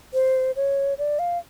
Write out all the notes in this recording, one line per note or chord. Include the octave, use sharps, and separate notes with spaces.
C5
C#5
D5
F5